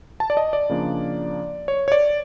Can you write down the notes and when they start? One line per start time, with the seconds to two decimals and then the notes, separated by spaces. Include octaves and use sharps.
0.20 A5
0.30 D5
0.37 D#5
0.53 D5
0.69 C#3 F3 A#3 D4
1.68 C#5
1.88 C#5
1.92 D5